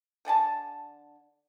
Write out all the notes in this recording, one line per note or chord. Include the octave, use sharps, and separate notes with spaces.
D3 D5 G#5 A5